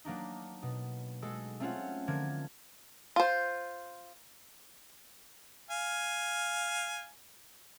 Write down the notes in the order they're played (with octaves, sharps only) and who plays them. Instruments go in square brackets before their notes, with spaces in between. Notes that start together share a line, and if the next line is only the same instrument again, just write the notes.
[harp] F#3 A#3 D4 D#4
B2
G#3 F#4 A4
A3 C4 C#4 F4 C#5 F#5
D3 F3 A#4 G#6
[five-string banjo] F4 C5
[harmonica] F5 G#5